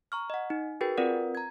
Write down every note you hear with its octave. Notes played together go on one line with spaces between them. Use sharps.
A#5 C#6 F6
D#5 F#5
D#4
F#4 G#4 A#4 B4 G5 A6
C4 F4 A#4 B4 D5 F#5
A#5 G#6